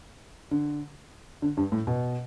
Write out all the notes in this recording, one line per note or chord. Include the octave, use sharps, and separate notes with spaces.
D3
D3
G2
A2
B2